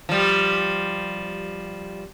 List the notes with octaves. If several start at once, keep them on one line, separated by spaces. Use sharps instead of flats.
F3 G3